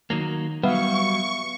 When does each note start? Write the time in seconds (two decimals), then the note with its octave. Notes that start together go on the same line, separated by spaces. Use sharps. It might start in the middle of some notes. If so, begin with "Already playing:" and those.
0.10 D#3 F#3 A#3
0.63 F#3 G3 B3 E5 F5 C#6